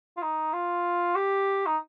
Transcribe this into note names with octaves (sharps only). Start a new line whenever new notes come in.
F4
D#4
F4
G4
D#4